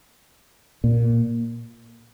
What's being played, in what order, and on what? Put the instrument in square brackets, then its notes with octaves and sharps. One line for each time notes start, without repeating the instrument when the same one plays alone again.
[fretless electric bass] A#2